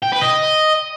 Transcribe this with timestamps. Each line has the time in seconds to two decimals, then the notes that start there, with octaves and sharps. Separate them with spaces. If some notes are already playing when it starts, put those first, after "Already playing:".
0.03 G5
0.12 B4
0.22 D#5